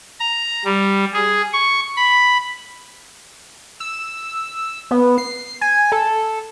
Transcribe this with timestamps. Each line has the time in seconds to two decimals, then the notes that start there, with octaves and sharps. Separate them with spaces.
0.19 A#5
0.65 G3
1.13 G#4
1.53 C#6
1.97 B5
3.80 E6
4.91 B3
5.18 C7
5.61 G#5
5.92 A4